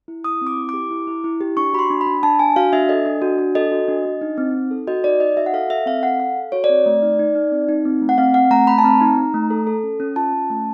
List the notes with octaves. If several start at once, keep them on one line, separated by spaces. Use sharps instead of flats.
E4
E4 D#6
C4
D6
E4
G4 D6
E4
E4
E4
G4
D4 C#6
F#4 B5
C6
D4
B5
D4
D4 A5
D4 G#5
F#4 F5
D4 E5
A4 D#5
D4
F#4
D4
A4 D#5
F#4
D4
D4
D#4
C4
D#4
A4
F#4 D#5
D#4 D5
D#4 D#5
F#4 E5
F#5
A4 F5
A4 E5
C4 F5
A4 F#5
A4 F5
A4
F#4 C#5
D5
C4
A3
D#4
D#4
D#4
C4
D#4
C4
A3
F#5
C4 F5
C4 F#5
A3 A#5
A3 B5
A5
C4 A#5
D#4
D#4
A3
A4
A4
C#4
C#4
F4 A5
C#4
A3